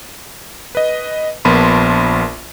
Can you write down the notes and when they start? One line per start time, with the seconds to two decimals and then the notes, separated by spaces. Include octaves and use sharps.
0.75 B4 D#5
1.45 A#1 B3 A#4 A5 B5 C6